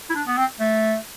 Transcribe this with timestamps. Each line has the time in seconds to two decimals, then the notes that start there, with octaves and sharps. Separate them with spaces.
0.10 E4
0.15 D4
0.27 B3
0.37 C4
0.60 A3